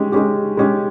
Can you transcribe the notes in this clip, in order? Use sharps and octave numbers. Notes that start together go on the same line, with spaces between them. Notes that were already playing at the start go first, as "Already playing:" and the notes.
Already playing: G#3 C#4 G4
G#3 C#4 G4
G#3 C#4 G4